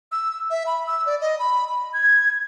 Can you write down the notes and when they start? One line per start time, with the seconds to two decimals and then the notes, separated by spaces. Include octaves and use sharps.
0.12 E6
0.50 E5
0.67 B5
0.87 E6
1.06 D5
1.21 D#5
1.39 B5
1.67 B5
1.93 G#6